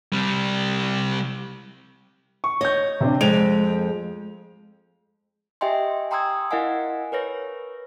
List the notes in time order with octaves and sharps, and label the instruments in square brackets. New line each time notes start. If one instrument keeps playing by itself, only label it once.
[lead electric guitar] C3 G3
[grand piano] C#6
[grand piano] C#5 G6 [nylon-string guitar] D#5
[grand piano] C3 C4 D4
[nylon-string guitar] F2 G#3 [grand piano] D7 F7
[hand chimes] G4 D#5 E5 G5 G#5 C6
G5 A#5 C6 D#6 E6 G#6
E4 A#4 D#5 F5 F#5 G#5
A#4 B4 C#5 A#6